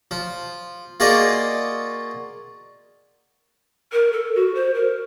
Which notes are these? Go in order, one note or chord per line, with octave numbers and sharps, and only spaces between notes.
F3
A#3 F4 F#4 G#4 D5 D#5
A#4
A4
F#4
C5
A#4